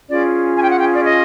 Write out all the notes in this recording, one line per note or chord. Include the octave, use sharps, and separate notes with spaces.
C#4 F4 G#4 D5
G#5
G5
F#5
G5
D5
D#5